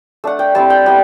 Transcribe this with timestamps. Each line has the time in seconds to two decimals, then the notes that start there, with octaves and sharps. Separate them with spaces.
0.24 A3 D4 F#5
0.39 G5
0.54 G3 C4 E4 A5
0.70 G5
0.86 G3 B3 E4 F#5